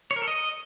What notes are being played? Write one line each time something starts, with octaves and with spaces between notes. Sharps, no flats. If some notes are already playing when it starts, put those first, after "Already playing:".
C#5
A#4
A4
D#5